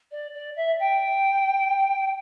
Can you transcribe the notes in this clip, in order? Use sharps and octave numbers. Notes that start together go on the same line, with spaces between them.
D5
D5
E5
G5